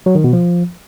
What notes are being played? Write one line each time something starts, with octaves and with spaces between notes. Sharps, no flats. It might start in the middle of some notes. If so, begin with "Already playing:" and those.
F#3
D#3
B2
F3